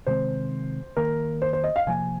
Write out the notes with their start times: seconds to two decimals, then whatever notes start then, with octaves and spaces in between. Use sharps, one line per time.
0.07 C3 D#3 G#3 C4 C5
0.97 D#3 A#3 A#4
1.42 C5
1.53 C5
1.64 D#5
1.76 F5
1.87 C3 F3 A#3 G#5